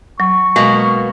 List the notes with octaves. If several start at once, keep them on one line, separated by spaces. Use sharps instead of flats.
F#3 C#6
B2 G#3 A#3